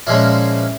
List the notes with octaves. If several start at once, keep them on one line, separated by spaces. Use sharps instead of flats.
A#2 F3 G#3 C#4 E4